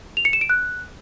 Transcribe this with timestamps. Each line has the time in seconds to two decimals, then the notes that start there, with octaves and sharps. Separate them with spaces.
0.17 F7
0.25 C#7
0.33 E7
0.41 D7
0.50 F#6